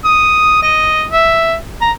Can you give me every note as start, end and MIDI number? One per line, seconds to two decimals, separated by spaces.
0.05 0.61 87
0.62 1.04 75
1.11 1.55 76
1.81 1.91 82